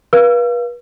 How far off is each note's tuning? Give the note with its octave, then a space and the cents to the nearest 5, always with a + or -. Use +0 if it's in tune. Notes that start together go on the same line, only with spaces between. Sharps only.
B4 -35 F5 -10 E6 +45